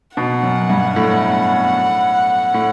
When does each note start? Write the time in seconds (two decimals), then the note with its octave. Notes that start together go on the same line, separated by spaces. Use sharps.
0.17 B2 F#5
0.43 F#2
0.69 G2
0.96 A2
2.54 A2